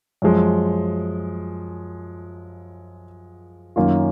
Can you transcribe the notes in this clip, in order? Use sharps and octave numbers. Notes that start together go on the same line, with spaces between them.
F#2 F3 G#3
F#2 D#3 A#3 C#4 F4